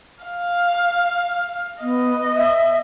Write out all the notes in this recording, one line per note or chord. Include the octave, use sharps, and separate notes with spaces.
F5
B3 D#5
E5